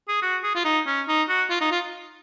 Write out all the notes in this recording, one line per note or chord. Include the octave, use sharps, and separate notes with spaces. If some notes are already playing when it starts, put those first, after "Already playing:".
G#4
F#4
G#4
F4
D#4
C#4
D#4
F#4
F4
D#4
F4